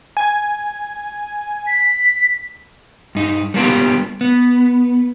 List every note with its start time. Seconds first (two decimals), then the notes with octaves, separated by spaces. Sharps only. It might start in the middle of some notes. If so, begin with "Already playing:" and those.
0.17 G#5
1.67 B6
3.15 G2 D#4
3.54 G3 A#3 B3 F4 G4
4.21 B3